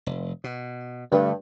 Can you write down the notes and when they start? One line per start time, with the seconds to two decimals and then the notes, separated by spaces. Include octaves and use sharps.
0.06 F1
0.44 B2
1.12 G2 D3 A3